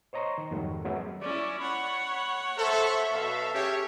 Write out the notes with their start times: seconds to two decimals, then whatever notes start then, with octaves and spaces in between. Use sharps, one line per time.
0.13 C5 C#5 D#5 A#5 C6 C#6
0.38 D#3
0.51 F2 G#2 D#3 F#3 G3 A3
0.85 F#3 G#3 B3 C#4 G#4 E5
1.22 C#4 E4 D5
1.59 C#5 F#5 B5
2.57 A4 C5 E5
3.12 B2 F#3 A4 F5
3.54 C#4 G4 G#4 C#5